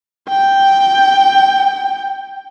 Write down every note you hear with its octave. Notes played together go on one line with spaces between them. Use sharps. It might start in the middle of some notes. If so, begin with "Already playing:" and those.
G5 G6